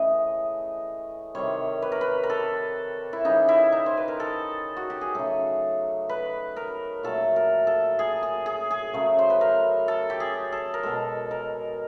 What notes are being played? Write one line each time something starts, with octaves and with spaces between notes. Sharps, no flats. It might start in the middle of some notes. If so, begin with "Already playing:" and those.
Already playing: C#3 E3 A3 D#5
C3 D#3 G3 C#5
B4
A#4
B4
A#4
A4
E4
C#3 E3 G3 D#4
E4
D#4
C5
B4
A#4
A4
F#4
G4
G#4
C#3 F#3 A3 A4
B4
A#4
A#2 F#3 A3 A4
A#4
A4
G#4
G#4
G#4
G#4
C#3 F#3 A3
C5
B4
A#4
A4
G4
G#4
A4
A#4
B2 G#3 A4
A#4